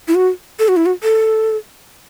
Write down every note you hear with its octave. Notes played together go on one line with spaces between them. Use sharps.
E4
F#4
A4
F#4
E4
F#4
A4